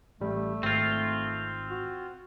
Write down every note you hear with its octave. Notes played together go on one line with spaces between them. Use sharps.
A1 G3 A3
G#1 C4 F4
F#4